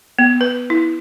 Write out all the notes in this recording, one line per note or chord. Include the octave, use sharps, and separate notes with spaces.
B3
B4
E4